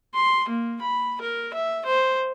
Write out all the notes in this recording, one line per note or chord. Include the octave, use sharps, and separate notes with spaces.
C6
A#3
B5
A#4
E5
C5